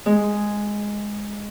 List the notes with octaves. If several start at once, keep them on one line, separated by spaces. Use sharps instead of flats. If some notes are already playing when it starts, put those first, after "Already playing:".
G#3